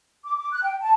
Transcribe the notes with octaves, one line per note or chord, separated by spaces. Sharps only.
D6
D6
F#6
G5
A5